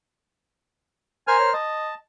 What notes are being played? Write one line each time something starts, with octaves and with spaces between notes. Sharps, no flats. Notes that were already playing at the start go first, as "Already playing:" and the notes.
A#4 C5 G#5 F6
C#5
D#5 A5